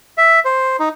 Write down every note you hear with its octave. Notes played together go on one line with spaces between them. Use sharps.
E5
C5
D#4